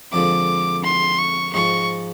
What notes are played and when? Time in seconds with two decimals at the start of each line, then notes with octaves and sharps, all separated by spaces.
0.13 F2 D3 F3 G#3 D6
0.84 C6
1.18 C#6
1.54 G#2 F3 G#3 C#6